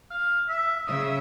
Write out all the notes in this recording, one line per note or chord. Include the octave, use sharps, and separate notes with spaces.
F5
E5
C#3 E5 D#6